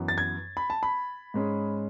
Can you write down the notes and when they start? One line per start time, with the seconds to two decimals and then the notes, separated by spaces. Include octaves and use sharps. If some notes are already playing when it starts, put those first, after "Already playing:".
Already playing: F#2 E3 B3
0.08 A6
0.18 G#6
0.57 B5
0.70 A5
0.83 B5
1.34 G#2 G#3 C#4